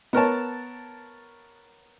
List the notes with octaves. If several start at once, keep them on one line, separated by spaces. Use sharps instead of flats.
B3 A#4 C#5 A5